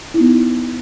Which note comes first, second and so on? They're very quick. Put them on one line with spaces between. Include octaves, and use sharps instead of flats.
E4 D#4 B3